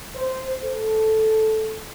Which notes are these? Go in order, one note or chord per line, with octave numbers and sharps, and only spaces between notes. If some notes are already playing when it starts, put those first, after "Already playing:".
C5
A4